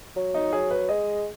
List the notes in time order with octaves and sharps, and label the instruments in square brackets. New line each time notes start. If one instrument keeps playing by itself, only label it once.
[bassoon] F#3
[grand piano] D#4
[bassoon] F#3 [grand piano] G#4
[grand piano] B4
[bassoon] G#3 [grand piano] D#5